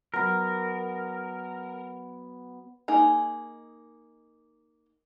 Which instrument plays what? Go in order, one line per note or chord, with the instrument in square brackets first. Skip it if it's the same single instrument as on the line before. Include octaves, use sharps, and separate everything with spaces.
[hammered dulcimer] F#3 B3 [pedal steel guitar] A#4
[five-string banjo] A#3 D#4 G#4 A#5